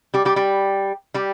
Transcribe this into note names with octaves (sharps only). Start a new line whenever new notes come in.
G3 G4
G3 G4
G3 G4
G3 G4